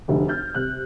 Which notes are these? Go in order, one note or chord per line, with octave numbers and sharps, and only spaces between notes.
F1 D2
F6 G6 A6
C3 F#6